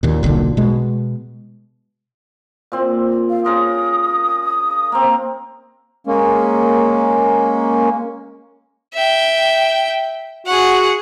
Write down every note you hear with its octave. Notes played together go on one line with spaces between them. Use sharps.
D#2 A#2
D#1 B1 A#2 D3
B2 G#3
A#2 C4
F5
C#3 A#4 C6 D#6
A#3 C4 A#5
G#3 A#3 C#4
E5 G5
F#4 G#4 F#5